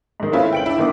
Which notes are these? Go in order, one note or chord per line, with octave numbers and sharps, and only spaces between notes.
G#2 D#3
A3 C4 C#4 E4 F4 B4
G5 D7 F#7
D4 E4
G1 D#3 B3 D6 D#6